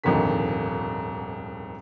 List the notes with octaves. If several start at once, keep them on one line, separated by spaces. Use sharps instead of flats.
D#1 F2 G#2 D3 D#3 B6